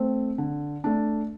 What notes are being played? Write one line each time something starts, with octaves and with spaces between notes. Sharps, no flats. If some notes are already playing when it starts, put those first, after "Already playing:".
Already playing: A3 C4
D3
A3 D4